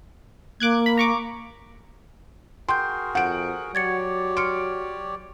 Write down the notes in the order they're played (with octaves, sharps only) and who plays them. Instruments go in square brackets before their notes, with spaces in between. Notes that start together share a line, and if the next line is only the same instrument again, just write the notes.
[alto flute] A#3 [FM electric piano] D6 F#6 G#6
[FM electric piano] B5
A#5 C#6 D6
[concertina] F#4 G#4 A#4 [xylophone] G5 G6 [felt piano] C6
[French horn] F2 [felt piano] F#5 D7 [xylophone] G6
[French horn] F#3 [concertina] G4 C#5 D5 [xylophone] G#6 A6 C#7
[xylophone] C6 F6 C#7 [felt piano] D7